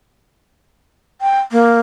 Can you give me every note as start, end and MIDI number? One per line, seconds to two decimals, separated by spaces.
1.21 1.40 79
1.52 1.80 58